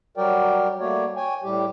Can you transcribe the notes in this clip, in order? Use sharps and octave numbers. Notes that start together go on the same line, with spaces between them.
F#3 G3 F#4 A#4 D5 G5
G3 A3 A#3 F#4 C#5 D5
C#5 G5 G#5
A2 G3 G4